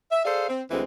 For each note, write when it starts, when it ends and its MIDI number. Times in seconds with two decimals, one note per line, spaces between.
0.11 0.22 76
0.25 0.45 68
0.25 0.45 69
0.25 0.45 72
0.25 0.45 74
0.25 0.45 77
0.48 0.62 60
0.71 0.83 38
0.71 0.83 52
0.71 0.83 56
0.71 0.83 60